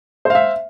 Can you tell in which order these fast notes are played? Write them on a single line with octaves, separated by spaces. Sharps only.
C5 F5 E5